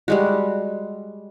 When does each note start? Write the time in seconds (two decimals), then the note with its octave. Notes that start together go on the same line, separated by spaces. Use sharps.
0.08 G3 G#3 F#4